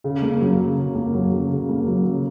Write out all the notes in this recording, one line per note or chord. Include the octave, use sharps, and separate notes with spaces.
C#3
A#3
F#3
C#3
C#3
A#3
F#3
C#3
C#3
A#3
F#3
C#3